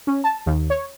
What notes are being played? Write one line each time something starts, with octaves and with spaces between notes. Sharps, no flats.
C#4
A5
D#2
C#5